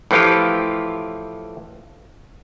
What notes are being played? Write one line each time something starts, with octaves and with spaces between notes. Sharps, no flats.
A2 E3 F3 F4 G4